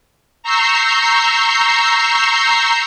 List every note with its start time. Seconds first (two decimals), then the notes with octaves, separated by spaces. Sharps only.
0.43 A#5 C#6 E6 G6 C7